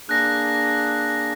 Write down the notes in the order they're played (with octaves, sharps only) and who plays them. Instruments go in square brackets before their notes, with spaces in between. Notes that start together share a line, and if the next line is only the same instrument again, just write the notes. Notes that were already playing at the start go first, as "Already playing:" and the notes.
[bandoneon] A#3 D4 G#4 [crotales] F#6 A#6